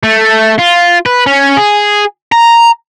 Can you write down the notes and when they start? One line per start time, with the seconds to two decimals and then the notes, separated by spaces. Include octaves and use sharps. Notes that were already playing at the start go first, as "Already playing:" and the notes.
0.03 A3
0.59 F4
1.06 B4
1.27 C#4
1.57 G#4
2.32 A#5